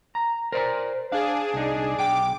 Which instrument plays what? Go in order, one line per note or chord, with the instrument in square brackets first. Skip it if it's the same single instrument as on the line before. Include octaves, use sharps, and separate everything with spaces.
[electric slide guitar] A#5
[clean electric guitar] A#4 D5 A#5 [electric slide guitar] C5
[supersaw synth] D4 G#4 [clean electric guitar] F5
[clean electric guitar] C2 D#4
[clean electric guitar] B1 G5 [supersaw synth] D6